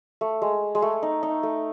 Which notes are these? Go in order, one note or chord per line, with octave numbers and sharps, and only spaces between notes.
A3
G#3
G#3
A3
D#4
D#4
A3